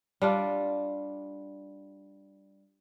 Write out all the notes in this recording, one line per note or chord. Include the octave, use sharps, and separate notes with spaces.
G3 D4 F4